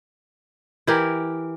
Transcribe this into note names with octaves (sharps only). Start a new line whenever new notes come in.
E3 E4 G4 A#4